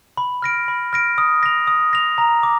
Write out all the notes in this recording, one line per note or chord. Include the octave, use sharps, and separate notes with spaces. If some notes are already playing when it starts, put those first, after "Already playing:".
B5
F6 A#6 D7
B5
F6 A#6 D7
D#6
A#6 F7
D#6
A#6 F7
A#5
D6